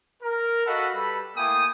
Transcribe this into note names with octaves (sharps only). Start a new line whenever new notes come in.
A#4
F#4 A4 D#5 F5 F#5 B5
G3 A4 B4 B5
A3 A#3 E4 G5 G#5 D#6